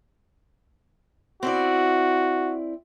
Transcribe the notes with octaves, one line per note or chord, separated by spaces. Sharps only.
C4 E4 F#4 D5